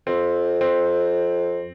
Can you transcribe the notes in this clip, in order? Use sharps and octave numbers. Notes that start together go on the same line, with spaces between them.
F2 C4
C4